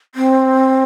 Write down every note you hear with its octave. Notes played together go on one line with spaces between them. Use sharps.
C4